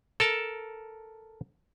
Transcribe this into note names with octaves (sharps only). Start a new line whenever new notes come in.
A4 A#4 A5